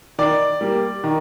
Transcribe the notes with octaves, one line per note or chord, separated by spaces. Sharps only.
D#3 D5
G3 A#3
D#3